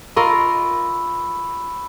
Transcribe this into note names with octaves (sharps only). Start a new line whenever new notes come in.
F4 A#4 D#5 B5 C#6 E6